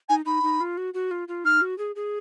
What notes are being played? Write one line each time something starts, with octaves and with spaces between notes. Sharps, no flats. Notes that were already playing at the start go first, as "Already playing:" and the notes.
D#4 G#5
D#4 B5
D#4
F4
F#4
F#4
F4
F4
D#4 F6
F#4
G#4
G#4